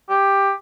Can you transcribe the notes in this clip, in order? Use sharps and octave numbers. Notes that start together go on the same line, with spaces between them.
G4